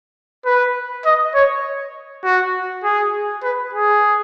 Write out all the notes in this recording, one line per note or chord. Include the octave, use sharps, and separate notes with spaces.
B4
D#5
C#5
F#4
G#4
B4
G#4